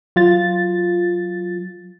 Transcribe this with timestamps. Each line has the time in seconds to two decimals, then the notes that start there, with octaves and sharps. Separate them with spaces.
0.16 F#3 F4 A6